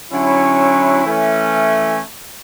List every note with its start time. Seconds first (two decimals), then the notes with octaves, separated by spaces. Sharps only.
0.12 D3 F#3 C#4 E4
1.06 E3 A3 C#4